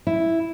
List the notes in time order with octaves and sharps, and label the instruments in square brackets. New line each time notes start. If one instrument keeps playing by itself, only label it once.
[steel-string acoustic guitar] E4